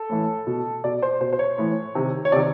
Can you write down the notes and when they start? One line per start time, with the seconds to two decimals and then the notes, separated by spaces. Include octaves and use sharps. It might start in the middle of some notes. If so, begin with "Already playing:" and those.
Already playing: A4
0.09 A2 E3
0.47 B2
0.84 B2 D5
1.02 C5
1.21 B2 C5
1.33 C5
1.39 C#5
1.58 A2 E3
1.95 C3 D#3
2.25 C#5
2.32 C3 D#3 D5